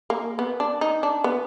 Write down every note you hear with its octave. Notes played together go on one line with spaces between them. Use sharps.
A#3
B3
D4
D#4
D4
B3